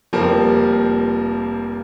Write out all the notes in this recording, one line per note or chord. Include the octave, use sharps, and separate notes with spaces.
F1 F3 G3 A#3